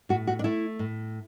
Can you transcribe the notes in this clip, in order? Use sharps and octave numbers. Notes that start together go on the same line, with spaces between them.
A2 F#4
F#4
D4
A3 E4
A2